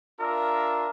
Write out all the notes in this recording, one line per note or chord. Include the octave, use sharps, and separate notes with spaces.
D4 F4 A#4 E5